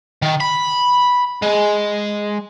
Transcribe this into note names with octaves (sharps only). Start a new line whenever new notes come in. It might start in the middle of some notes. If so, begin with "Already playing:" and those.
D#3
B5
G#3